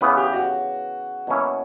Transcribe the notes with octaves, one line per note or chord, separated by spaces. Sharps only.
C#3 E3 B3 B4
G4
F#4
B2 F#3 A#3 C#4 E4